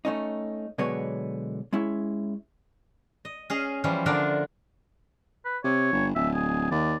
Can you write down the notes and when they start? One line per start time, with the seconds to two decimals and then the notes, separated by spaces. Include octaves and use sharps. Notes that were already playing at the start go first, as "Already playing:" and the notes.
0.05 A3 C#4 D#4
0.78 B2 D3 F#3 G#3 B4 C#5
1.73 G#3 C#4 E4
3.25 D#5
3.50 C#4 G#4 D#5 F5
3.84 E3 F3 G3 C#4
4.06 D3 A3 D4 F4 A#4 D5
5.45 B4
5.64 C3 C#5
5.92 G1
6.15 D1 E5
6.35 G#4
6.71 D#2 D5